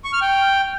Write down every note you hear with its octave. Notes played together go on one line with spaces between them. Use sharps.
C#6
F6
G5